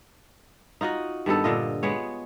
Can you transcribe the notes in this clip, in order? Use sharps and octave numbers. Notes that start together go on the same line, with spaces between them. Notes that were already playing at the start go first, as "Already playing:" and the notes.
D#4 F4 F#4 D#5
G2 D#3 B3 A4
A#2 D3 F4 D#5
G#3 B3 C#5